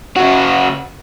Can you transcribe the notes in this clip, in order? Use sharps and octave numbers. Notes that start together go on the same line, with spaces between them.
C#3 F#4